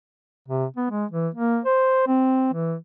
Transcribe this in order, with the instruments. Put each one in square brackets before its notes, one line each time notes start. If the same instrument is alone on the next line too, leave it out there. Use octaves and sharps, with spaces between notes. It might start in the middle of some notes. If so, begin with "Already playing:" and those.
[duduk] C3
B3
G#3
E3
A#3
C5
C4
E3